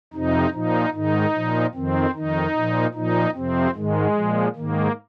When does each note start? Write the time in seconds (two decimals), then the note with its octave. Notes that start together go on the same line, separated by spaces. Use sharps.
0.13 F2 C3 F3 D#4
0.53 A#2 F3 D#4
0.93 G#2 D#3 D#4
1.34 A#2 F3
1.74 F2 D#3 C4
2.15 F2 D#3 D#4
2.54 A#2 F3
2.94 A#2 F3 D#4
3.34 F2 C3 F3 C4
3.75 G#2 D#3 G#3
4.15 A#2 F3
4.56 G#2 D#3 A#3